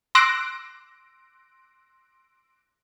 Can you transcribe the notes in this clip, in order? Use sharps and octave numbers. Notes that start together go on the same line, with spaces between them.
C6 D6 E6 F#6 A#6 D7